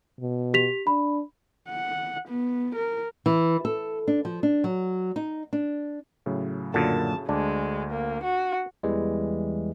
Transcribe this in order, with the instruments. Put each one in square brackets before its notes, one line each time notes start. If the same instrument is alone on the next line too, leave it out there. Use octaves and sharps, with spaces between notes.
[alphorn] B2
[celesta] G4 B6 F7
[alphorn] D4 [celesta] B5
[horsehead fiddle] F#5
B3
A#4
[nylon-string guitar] E3
A4
D4
F3
D4
F#3
D#4
D4
[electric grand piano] A2 C#3 F#3
[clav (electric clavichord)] F#2 A#2 D3 [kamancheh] A5
[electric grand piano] D2 [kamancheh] G#3 [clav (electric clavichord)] D4
[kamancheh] A#3
F#4
[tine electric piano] E2 E3 G3 G#3